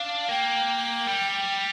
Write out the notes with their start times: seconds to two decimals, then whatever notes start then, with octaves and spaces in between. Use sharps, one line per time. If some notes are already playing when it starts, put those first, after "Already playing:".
Already playing: D4 F5
0.29 A#3 G5
1.07 G3